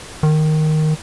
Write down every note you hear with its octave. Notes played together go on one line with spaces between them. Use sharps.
D#3